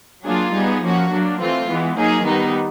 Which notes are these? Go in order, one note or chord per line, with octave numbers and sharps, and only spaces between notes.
F#3 A#3 D4 F4 G#4
G3 B3 D#4 G#4
F3 A#3 C#4 F#4
F#3 A#3 D4
E3 A3 C4 F4
E3 G#3 B3
F#3 A#3 D#4 G#4
D#3 G3 B3 D#4